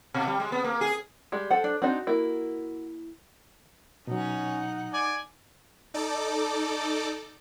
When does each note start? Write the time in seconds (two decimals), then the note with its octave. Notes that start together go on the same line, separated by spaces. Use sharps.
0.14 B2
0.27 G3
0.40 G#3
0.52 B3
0.64 A#3
0.81 G#4
1.32 G3 G#3
1.50 A4 C5 F#5
1.64 D4
1.82 C4 D4 D#4 F#4
2.07 A#3 E4
4.07 B2 F#3 C#4 D#4 F#5
4.93 D5 G#5
5.94 D#4 A4 D5 D6